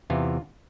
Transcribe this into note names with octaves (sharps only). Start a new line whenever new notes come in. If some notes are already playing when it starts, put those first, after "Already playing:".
E2 C3 E3 F4